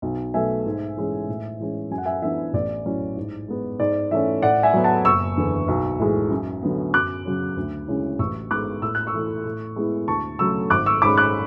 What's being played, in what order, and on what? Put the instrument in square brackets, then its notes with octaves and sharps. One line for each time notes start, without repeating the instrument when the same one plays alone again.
[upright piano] B1
B2 F#3 A3 E5 G#5
G#2
E3 G#3 C#4
A2
E3 G#3 C#4
F#2 G#5
F#5
E5 G#5
E3 B3 D4 E5
A1 D5
A2 F#3 C#4 E4
G#2
G#3 B3
G#2 D5
E3 A3 C#4 E5
A2 D5 F#5
E5 G#5
F#3 B3
F#5 A5
F#1 C#6 E6
E2 D3
B1
A2 E3 G#3
F#2
D3 F#3 B3
F#2 D6 F#6
C#3 F#3 C#4
D2
C#3 G#3 C#4 E4
A1 C#6 E6
G#2 G#3 B3 D6 F#6
A2 E6
F#6
C#6 E6
E3 A3 E4
A2
G#3 B3 E4
D2 A5 C#6
C#3 F#3 A3 C#6 E6
G#1 D6 F#6
C#6 E6
G#2 G#3 C#4 B5 D6
D6 F#6